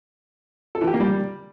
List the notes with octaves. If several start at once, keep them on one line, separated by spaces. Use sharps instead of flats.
A4
E3
G4
A#3
G3